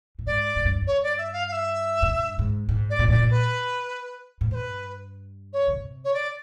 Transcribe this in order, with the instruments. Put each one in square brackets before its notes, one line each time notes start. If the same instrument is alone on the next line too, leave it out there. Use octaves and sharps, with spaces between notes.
[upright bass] A2
[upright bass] G#2 [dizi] D5
[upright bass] G#2
G2
F#2
[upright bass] G2 [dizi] C#5
[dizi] D5
E5
F5
F5
E5
[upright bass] G#2
G2
G#2
G#2
[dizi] D5
[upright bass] A#2
[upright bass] A2 [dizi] D5
[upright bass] A#2
[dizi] B4
[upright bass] G#2
[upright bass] G2 [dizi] C5
[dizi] B4
C#5
[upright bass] C#3
C3
[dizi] C#5
D5